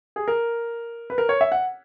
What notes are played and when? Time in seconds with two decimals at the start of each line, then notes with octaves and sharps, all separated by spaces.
0.16 G#4
0.28 A#4
1.10 B4
1.18 A#4
1.29 C#5
1.41 E5
1.52 F#5